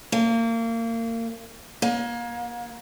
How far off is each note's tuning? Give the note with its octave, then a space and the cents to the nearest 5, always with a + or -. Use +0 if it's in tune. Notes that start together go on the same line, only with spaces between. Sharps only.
A#3 -30
A#3 +30